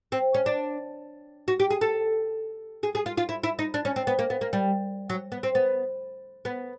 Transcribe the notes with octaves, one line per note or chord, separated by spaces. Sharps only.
C4
C#4
D4
F#4
G4
G#4
A4
G#4
G#4
F4
F4
E4
E4
D#4
D4
C#4
C4
B3
A#3
B3
A#3
G3
F#3
B3
C4
B3
B3